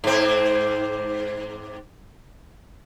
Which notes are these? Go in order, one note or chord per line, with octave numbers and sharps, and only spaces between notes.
G#2 C4